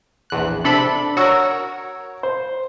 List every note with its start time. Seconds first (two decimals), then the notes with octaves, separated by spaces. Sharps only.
0.30 A#1 E2 F#6
0.64 C3 D4 A4 B5
1.17 F#4 A#4 C#5 E6
2.23 C5